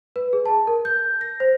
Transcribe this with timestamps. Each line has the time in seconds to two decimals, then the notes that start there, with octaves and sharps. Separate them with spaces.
0.16 B4
0.33 G#4
0.46 A5
0.67 A#4
0.85 G6
1.21 A#6
1.40 C5